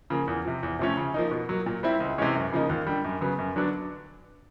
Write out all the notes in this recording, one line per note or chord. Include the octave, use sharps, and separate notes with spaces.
C#3 F3 A#3
E2
C3 F3
E2
C3 F3 A3 C#4
C#3
F3 A#3 D#4
B2
F#3 A#3
A#2
G3 C4 E4
C#2
C3 E3 G#3 C#4
F#2
C#3 F3 A#3 D#4
D#2
D3 G3
F#2
C#3 F#3 B3
F#2
D3 F#3 B3 D4